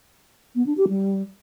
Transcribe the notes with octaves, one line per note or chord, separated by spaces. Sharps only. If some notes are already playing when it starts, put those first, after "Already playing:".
B3
D4
G4
G3